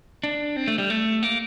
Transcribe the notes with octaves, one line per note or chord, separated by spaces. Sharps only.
D4
C4
A3
G3
A3
A#3